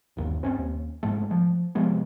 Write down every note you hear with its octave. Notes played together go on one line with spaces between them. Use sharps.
G1 D#2
G1 C4 C#4
D#2
F#1 G#2 G#3 A3
F3
C3 F3 G#3 B3